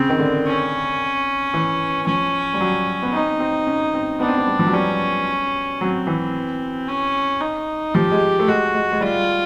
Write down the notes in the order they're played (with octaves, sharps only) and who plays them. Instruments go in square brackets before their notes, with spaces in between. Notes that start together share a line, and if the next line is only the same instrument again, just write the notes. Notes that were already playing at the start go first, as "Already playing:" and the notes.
Already playing: [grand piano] C#3 [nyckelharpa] C4
[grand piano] D#3
D3
[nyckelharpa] C#4
[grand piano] E3
[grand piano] F3 [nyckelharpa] C#4
[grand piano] G3
F#3
B3
[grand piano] C4 [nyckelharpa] D#4
[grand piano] C4
C#4
C4
[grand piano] B3 [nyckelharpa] D4
[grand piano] C4
B3
G3
F3
F#3
[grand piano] G3 [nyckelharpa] C#4
[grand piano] F#3 [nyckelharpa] C4
[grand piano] E3
[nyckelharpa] C#4
D#4
[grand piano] F3 [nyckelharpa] G4
[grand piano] G#3
A3
[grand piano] G#3 [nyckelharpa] F#4
[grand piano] G#3
G#3
[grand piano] G3 [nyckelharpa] F4